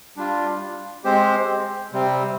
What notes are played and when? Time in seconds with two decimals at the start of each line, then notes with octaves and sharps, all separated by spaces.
0.16 G3 D4 F4
1.04 G#3 C4 G4 C5
1.93 C3 G3 C4